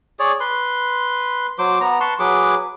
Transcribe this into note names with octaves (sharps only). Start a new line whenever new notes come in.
G#4 C#5 D5
B4 C6
F#3 C5 D6
B3 A#5
B4 A5 C6 C#6
F#3 G#4 B4 D6